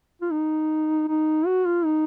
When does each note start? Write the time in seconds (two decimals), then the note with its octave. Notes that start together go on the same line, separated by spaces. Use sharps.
0.22 F4
0.31 D#4
1.09 D#4
1.46 F#4
1.65 F4
1.85 D#4